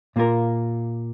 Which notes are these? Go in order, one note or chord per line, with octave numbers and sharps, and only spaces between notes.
A#2 A#3 F4 A#4